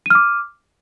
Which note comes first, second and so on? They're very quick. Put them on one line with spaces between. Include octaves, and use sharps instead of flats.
D#7 F6 D6